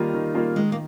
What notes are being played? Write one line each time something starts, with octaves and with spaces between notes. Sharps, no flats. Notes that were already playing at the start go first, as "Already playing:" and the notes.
Already playing: D#3 G3 A#3 D#4 F4
D#3
G3 A#3 F4
D#3 G#3
A#3